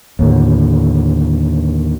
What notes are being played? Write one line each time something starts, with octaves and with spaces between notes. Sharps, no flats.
D#2 A2 D3